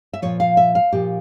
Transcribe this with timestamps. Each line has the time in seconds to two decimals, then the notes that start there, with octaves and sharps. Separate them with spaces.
0.13 E5
0.22 A#2 F3 C#5
0.40 F5
0.57 E5
0.75 F5
0.93 A#2 F3 G4